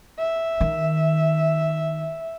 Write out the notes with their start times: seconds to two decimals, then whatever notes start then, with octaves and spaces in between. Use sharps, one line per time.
0.19 E5
0.61 D#3